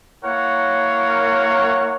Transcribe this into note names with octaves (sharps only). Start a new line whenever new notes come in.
A#3 E4 A#4 C#5 F#5